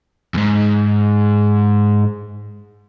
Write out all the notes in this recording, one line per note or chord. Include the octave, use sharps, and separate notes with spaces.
E2 G#2